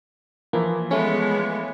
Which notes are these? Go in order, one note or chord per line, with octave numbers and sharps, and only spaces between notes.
E3 F3 A#3 E4
G#3 A3 B3 C#4